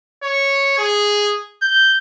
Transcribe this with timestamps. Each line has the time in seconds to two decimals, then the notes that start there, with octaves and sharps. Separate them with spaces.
0.23 C#5
0.78 G#4
1.62 G6